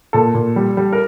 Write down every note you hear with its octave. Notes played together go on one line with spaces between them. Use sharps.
A#2 A4
A#2
G3
G3
A#4